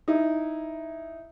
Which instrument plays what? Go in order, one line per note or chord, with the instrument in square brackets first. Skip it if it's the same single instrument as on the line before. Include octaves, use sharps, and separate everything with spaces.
[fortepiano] D#4 E4